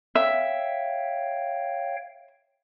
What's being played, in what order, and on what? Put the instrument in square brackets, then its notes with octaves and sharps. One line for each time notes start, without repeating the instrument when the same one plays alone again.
[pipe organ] C#5 F5 G5 [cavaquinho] E5